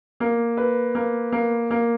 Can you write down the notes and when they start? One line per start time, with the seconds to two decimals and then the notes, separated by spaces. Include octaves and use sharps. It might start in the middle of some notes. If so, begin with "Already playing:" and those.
0.20 A#3
0.57 B4
0.95 A#3
1.32 A#3
1.71 A#3